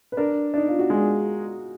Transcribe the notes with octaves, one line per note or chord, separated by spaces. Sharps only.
B4
D4 A#4
D4 D#4
F4
F#4
G#3 G#4